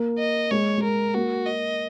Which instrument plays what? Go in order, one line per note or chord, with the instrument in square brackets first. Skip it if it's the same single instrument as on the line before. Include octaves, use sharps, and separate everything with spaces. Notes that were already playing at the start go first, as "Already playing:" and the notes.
Already playing: [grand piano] A#3
[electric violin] D#5
[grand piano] G#3 [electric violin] C#5
[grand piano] G#3
[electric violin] A#4
[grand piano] A#3 [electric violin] F#4
[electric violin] D#5